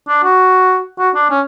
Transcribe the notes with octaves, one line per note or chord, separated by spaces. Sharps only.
D4
F#4
F#4
D4
C#4